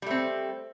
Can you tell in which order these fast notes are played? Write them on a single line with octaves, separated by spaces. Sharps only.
G3 A3 C4